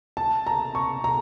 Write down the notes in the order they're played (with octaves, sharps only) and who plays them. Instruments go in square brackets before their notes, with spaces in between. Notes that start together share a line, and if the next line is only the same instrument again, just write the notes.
[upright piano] A5
A#5
C#6
A#5